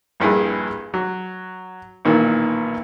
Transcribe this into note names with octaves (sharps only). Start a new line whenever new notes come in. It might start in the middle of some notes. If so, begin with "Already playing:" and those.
A#1 G2 E4 G#4
F#3
B1 A#2 D#3 E3